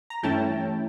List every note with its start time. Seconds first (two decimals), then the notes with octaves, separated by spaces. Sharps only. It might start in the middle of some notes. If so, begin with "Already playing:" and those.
0.10 A#5
0.23 G2 E3 A3 C#4 E4 G5 A5